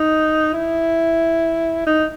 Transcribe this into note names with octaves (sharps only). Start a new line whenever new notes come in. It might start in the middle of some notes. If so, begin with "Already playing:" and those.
Already playing: D#4
E4
D#4